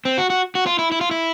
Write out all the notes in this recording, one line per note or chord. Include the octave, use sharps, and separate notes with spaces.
C4
F#4
F#4
F#4
F4
E4
E4
F4
E4